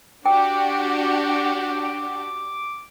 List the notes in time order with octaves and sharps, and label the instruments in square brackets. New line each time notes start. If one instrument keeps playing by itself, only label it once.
[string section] D4 F#4 G4 [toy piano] G5 [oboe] D6